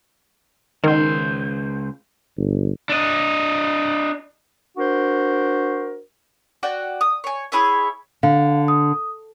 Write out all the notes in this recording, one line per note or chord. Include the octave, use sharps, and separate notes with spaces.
C#2 D#3 A#4 C5
G1
D4 D#5
D4 F#4 A#4 C5
F#4 D5 G5
D#6
C#5 G#5
E4 G#4 C#5 E5
D3 F5
D#6